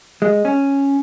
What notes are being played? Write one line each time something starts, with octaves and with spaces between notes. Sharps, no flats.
G#3
C#4